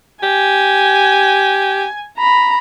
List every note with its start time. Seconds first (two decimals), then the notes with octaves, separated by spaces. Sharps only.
0.23 G4 G#5
2.17 A#5 B5